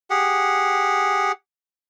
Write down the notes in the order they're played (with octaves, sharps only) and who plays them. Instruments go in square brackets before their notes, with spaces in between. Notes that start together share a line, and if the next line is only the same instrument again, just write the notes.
[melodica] G4 G#4 F#5